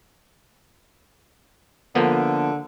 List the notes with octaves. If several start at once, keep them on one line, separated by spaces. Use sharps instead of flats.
D3 F3 A#3 B3